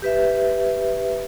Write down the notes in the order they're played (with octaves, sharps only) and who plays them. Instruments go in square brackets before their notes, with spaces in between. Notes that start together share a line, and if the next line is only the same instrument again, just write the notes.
[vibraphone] G4 B4 E5